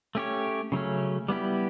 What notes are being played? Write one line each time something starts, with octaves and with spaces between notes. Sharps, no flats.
A3 C#4 G4 C#5
C#3 F#3 A3 C#4
G3 B3 E4 G4